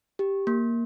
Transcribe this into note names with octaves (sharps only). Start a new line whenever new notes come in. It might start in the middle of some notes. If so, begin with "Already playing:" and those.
G4
A#3